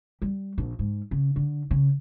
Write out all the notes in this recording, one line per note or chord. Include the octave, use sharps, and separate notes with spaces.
G3
A#1
G#2
C#3
D3
C#3